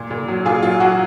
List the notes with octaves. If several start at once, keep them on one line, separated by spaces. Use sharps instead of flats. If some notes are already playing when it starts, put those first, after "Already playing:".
Already playing: A#2
A#2
F#3
A#2 F4 G#4
F#3 F4
F#3 F#4